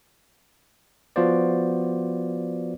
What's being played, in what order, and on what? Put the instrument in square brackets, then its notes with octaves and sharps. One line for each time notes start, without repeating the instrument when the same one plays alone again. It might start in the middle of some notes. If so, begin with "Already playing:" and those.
[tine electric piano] F3 B3 F4 F#4 C5 D5